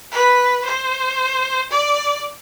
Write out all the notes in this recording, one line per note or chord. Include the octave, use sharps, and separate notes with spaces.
B4
C5
D5